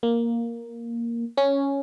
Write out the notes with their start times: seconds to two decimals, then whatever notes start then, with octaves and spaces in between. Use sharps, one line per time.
0.03 A#3
1.37 C#4